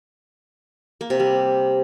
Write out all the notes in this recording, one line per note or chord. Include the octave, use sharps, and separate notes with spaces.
A#3
C3
G3